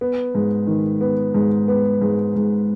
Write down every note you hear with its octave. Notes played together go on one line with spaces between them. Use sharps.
B3
G#2
D#3
B3
G#2
B3
G#2
G#2